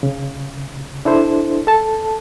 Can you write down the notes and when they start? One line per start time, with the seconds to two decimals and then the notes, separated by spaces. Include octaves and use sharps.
0.03 C#3
1.05 D4 E4 A4 C5
1.67 A4 A5